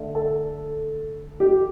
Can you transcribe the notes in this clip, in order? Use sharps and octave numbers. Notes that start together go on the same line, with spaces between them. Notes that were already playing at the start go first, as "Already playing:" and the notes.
Already playing: D3 A3
A4
G4